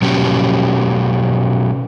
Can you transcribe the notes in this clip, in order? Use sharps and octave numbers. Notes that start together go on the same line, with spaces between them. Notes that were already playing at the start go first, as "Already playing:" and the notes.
B2 F#3 C#4 G4